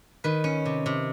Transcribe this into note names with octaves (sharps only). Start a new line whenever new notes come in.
D#3 B4
C#4
C3
C3